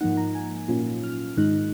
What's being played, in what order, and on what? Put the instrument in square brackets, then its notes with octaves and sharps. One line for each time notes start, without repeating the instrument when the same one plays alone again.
[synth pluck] G#2 F3 A#3 D#4 F#5
A#5
G#5
A#2 F#3 A#3 C#4 F4
F6
G#2 D#3 G#3 D#4 F#6